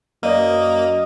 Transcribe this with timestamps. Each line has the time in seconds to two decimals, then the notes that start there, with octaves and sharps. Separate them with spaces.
0.23 F#2 A#3 B4 D5 D#5